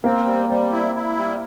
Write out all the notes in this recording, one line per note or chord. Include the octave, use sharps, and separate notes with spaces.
A#3 C4
G3
G3 C4
E4
E4
G3